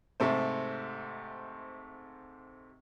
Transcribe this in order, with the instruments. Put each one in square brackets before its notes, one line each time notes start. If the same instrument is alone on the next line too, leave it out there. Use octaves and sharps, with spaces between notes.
[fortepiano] G#2 C3 A3 C5